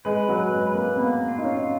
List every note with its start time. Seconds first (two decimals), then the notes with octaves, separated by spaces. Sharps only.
0.05 G#3 B4
0.29 F#3
0.36 B4
0.52 G#3
0.67 B4
0.75 A#3
0.97 A#3 B3
1.28 F4
1.38 D#4
1.44 C#4
1.59 F4